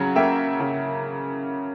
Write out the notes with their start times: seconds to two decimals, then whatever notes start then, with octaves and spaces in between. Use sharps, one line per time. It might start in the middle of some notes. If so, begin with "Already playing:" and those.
Already playing: C#3 F#3 F#5 A#5
0.16 A#3 E5 G5
0.60 C#3